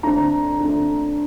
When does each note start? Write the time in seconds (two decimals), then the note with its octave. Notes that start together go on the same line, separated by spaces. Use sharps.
0.03 D3 A3 C4 A#5
0.60 D3 A3 C4